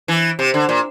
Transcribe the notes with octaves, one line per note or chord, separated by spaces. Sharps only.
E3
C3
D3
A#2